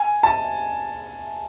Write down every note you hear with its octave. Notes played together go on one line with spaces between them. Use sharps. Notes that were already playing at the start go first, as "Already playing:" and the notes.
Already playing: G#5
A5